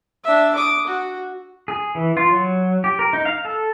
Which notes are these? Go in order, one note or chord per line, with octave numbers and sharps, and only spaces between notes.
D4 E5
D6 D#6
F#4
G#4
E3
F4
F#3
G4
A#4
D#4
F5
A4